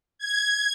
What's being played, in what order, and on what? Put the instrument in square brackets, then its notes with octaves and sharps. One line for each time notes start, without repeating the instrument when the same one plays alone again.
[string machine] G#6